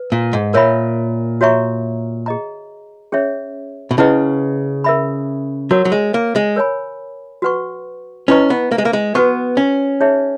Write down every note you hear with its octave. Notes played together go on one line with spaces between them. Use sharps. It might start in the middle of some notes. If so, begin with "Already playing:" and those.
Already playing: B4
A#2
G#2
A#2 A#4 C#5 E5 B5
F#4 C#5 E5 A#5 C#6
G#4 D#5 A#5
C#4 G#4 C#5 E5
B2
C#3 E4 B4 D#5 F#5
A#4 E5 B5
F#3 F#4 A#4 C#5 F#5
F#3
G#3
A#3
G#3
A#4 C#5 G#5 B5
F#4 B4 F#5 C#6
C#4 E4 B4 D#5 A#5 C#6
B3
A#3
G#3
A#3
G#3
B3 F#4 B4 F#5 C#6
C#4
D#4 G#4 C#5 E5